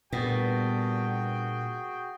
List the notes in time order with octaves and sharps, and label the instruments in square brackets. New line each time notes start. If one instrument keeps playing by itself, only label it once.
[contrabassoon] G2 [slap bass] A#2 [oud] B3 [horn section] F#4 G#4 G5